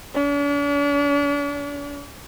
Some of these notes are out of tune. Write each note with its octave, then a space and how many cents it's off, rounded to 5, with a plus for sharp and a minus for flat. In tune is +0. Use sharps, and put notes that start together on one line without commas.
D4 -45